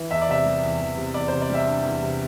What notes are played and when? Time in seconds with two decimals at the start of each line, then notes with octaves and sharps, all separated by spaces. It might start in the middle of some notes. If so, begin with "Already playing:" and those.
Already playing: E3
0.11 E2 E5
0.21 D5
0.29 C3 E5
0.46 G3
0.63 E2
0.81 E2
0.97 C3
1.14 E2 D5
1.28 C3 C5
1.41 D5
1.50 G3 E5
1.67 D4
1.85 E2
2.02 C3